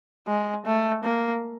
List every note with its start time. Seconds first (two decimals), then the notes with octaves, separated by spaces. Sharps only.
0.28 G#3
0.66 A3
1.04 A#3